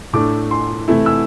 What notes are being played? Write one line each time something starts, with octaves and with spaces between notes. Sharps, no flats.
A2 A3 D4 D6
C6
C3 E3 A3 E4
E6